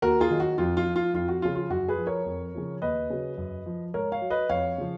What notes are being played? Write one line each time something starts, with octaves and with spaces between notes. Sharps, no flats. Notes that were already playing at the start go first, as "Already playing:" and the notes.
D#2 F#4 A#4
F4 G#4
D#3 F#3
F#4
F2 F4
F4
F3
F4
F2 F4
F#4
C#3 F3 F4
F4
F#2 F#4
G#4 B4
F3
A#4 C#5
F2
C#3 F3
D#2 B4 D#5
C#3 F#3
F#2
F3
G#2 A#4 C#5
C#5 F5
F#3
B4 D#5
F2 C#5 F5
C#3 F3